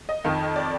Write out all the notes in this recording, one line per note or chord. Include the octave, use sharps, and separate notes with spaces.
D#5
F2 D#3
D5